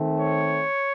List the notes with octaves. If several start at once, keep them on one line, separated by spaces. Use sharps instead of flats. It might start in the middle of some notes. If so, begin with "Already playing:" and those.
Already playing: D#3 A3 C4
C#5